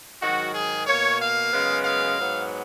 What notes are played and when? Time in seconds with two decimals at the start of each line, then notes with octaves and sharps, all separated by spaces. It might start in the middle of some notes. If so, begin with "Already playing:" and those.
0.21 G#2 D#3 F#3 F#4
0.55 G#4
0.87 B2 A#3 C#5
1.20 F5
1.52 F#2 C#3 G#3 B3
1.85 F5
2.18 G#2 F#3 B3